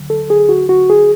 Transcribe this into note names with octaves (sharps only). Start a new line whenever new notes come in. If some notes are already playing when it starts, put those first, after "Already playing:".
Already playing: D2 D3 F#3
A4
G#4
F#4
F#4
G#4